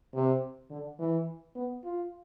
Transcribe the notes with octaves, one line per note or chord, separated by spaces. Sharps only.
C3
D3
E3
B3
F4